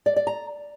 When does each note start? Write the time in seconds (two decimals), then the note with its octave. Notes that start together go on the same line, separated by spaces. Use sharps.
0.06 D5
0.16 D5
0.27 A#5